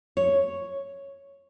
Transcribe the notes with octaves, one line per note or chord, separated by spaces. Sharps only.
C#5